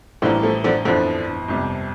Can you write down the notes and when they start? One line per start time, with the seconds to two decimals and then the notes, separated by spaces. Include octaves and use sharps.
0.22 A1 A2 D3 E3 F3 G3 A#3
0.43 F3 A3
0.64 D3 F3
0.85 G1 F2 D3 E3 F3
1.48 G1 F2 C3 G3